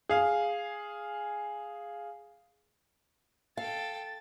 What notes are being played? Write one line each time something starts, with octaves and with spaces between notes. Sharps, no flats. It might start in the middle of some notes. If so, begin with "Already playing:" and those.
G#4 F5
A4 F5 G5 A6